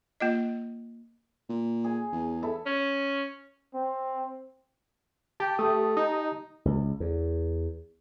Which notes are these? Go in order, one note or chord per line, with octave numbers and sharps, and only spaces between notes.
A#3 F4 D#5
A#2
G#4 G#5
E2
E4 A4 E5
C#4
C4
G4 A5
A3 G4 A5 D#6
D#4
C#2
E2